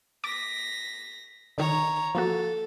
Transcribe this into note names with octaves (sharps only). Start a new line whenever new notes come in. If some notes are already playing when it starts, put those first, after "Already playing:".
D6 A#6 B6
D3 D#3 C#5 A#5
F3 A#3 F#4 A4